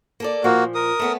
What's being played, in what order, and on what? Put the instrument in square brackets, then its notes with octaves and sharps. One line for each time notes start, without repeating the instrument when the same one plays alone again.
[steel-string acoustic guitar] A#3 A4 D5
[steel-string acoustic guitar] A#2 F3 [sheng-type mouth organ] A#3 F#4
[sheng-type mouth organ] A#4 D#6
[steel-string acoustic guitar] A3 B3 C#4